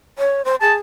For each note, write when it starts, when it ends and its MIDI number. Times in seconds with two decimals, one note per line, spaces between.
0.18 0.42 73
0.45 0.55 72
0.61 0.78 68
0.61 0.73 81